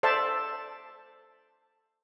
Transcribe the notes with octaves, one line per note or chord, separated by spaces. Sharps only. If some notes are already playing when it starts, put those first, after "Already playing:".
A4 C5 D5 E5 A5